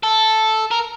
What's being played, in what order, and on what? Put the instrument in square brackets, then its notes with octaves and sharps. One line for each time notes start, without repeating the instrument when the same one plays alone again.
[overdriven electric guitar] A4
A#4